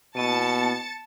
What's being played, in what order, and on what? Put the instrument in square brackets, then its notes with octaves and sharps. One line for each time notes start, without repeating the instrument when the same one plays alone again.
[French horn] B2 [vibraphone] A#3 B3 E4 [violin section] A5 A6 C#7